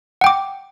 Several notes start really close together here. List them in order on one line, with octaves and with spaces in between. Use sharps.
F#5 G5 D6